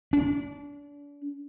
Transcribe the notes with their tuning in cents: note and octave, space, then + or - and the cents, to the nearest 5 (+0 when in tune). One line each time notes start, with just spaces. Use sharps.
D4 -35